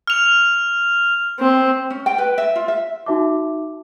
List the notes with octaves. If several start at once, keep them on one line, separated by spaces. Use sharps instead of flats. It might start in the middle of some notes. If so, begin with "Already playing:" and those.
F6 F7
C4
C#4
G5
B4
E5
F4
E5
D#4 F#4 E5 A5 D6